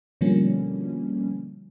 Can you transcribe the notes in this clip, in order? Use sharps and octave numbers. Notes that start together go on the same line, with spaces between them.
B2 D3 F3 G3 A#3 C#4